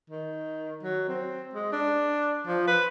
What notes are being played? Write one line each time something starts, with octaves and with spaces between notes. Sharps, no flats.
D#3
F#3
C4
G#3
D4
F3
B4